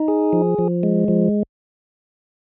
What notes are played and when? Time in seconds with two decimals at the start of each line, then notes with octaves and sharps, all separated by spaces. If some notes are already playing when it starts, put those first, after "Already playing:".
Already playing: D#4
0.08 G#4
0.33 F3
0.58 F3
0.83 G#3
1.08 F3